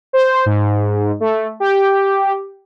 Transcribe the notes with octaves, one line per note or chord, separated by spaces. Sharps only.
C5
G#2
A3
G4